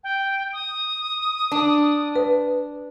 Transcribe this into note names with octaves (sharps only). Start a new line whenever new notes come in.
G5
D#6
D4
B4